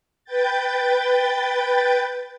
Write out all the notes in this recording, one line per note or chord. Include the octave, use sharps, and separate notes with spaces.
B4 G5 G6 A6